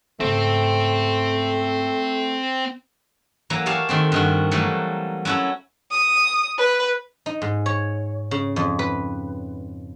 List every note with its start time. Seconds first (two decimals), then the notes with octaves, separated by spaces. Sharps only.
0.20 G#2 C#3 A3 C4
3.50 E3 F#3 A#3 A#5
3.66 G4 G#4 C#5 F5 A5
3.89 D#3 A3 C4
4.12 G2 D#3 F#4
4.51 E3 F#3 G3 A3 A#3
5.25 F#3 C#4 E4 F#4 A4
5.91 D#6
6.58 B4
7.26 D#4
7.42 G#2
7.66 C#5
8.31 C#3
8.56 F2
8.79 B4